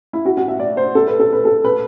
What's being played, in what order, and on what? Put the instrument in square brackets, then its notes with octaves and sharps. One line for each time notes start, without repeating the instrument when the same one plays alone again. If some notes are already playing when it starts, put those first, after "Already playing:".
[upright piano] E4
F#4
F#4
E5
D5
C5
A4
B4
A4
B4
A4
B4